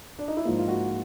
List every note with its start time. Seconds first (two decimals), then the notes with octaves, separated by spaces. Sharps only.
0.19 D4
0.28 D#4
0.37 E4
0.45 G#2 F3 A#3 F4
0.59 F4
0.68 F#4